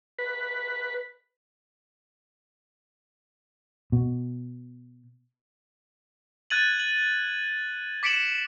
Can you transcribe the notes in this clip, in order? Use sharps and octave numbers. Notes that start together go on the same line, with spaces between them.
B4
B2
F#6 G#6 A6 D#7 F#7
F#7
D6 B6 C#7 D7 E7 F#7